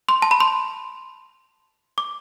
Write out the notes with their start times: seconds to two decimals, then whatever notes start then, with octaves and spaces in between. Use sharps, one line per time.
0.09 C6
0.22 A5
0.31 B5
0.40 C6
1.98 D6